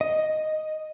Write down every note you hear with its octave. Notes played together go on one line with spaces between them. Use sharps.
D#5